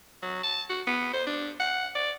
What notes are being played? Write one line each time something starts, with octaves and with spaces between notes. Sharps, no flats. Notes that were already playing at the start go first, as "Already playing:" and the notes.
F#3
A5
F#4
B3
C5
D4
F#5
D5